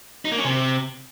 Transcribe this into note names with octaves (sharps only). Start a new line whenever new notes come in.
D#4
A#3
C#4
C3